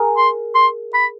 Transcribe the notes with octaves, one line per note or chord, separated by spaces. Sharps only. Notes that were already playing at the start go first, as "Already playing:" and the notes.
Already playing: G#4 A#4
C6
C6
B5